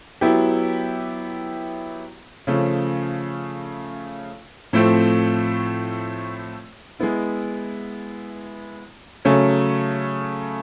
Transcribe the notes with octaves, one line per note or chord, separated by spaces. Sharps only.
F#3 B3 E4 G4
C#3 F3 A3 C#4
A2 F3 A3 C4
G#3 B3 E4
C#3 F#3 A3 C#4